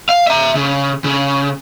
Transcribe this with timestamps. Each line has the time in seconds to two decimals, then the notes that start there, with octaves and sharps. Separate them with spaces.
0.09 F5
0.27 E5 A#5
0.55 C#3
1.04 C#3